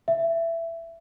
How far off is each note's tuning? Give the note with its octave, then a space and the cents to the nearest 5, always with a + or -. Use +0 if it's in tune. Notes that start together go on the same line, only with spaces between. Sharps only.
E5 +15